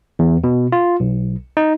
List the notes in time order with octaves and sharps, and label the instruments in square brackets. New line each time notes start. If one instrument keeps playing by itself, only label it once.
[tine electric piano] E2
B2
F4
B1
D#4